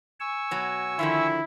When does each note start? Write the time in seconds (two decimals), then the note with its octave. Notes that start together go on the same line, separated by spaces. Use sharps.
0.20 G#5 C#6 E6
0.51 B2 F#3
0.99 D3 D#3 F3 E4